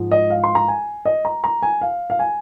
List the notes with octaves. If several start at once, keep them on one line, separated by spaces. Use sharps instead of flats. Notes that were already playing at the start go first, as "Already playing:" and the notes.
Already playing: G#2 F3
D#5
F5
C6
A#5
G#5
D#5
A#5
A#5
G#5
F5
F5
G#5